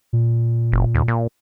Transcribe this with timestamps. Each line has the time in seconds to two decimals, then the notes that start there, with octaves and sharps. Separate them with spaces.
0.13 A#2
0.72 F#1
0.95 D#2
1.08 A#2